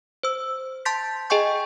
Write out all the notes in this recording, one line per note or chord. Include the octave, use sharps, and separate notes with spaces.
C5 E6
A5 C6 G6 A6 B6
G#4 D#5 G5 G#5 C#6 G6